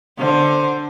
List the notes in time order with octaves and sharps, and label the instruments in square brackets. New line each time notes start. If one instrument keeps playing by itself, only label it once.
[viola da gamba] D3 C5